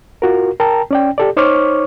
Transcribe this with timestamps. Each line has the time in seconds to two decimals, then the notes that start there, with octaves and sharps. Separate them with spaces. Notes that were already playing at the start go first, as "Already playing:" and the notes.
0.22 F4 F#4 A#4
0.60 A#4 G5 A5 A#5
0.91 C#4 D5 G5
1.18 G4 A4 D5
1.37 D#4 C5 C#5 C#6 D6 F6